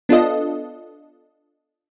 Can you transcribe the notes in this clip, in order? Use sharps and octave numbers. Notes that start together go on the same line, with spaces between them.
B3 D4 F4 A4 D#5